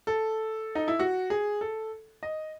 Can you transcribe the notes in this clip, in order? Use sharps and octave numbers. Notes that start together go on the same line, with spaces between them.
A4
D#4
E4
F#4
G#4
A4
D#5